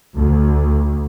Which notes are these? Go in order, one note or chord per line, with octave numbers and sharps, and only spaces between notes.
D2